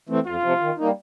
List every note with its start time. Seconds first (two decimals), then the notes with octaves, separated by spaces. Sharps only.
0.09 E3 A3 C4
0.26 F2 F4
0.43 C3 F3
0.60 D#3
0.78 G3 A#3 D#4